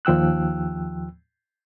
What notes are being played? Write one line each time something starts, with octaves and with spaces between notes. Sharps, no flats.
D#2 F3 G5 E6 F#6